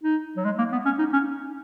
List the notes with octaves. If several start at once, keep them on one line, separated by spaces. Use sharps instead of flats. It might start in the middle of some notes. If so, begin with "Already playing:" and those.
D#4
F#3
G#3
A#3
B3
C#4
D#4
C#4